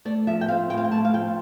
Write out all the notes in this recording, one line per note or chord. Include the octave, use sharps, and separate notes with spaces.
A3 D5
F3 E5
G5
C4 F5
A2 G5
F5
G5
A3 A5
F5
F3 G5